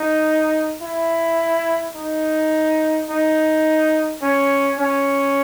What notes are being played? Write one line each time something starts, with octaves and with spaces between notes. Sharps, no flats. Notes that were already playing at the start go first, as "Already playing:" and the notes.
Already playing: D#4
E4
D#4
D#4
C#4
C#4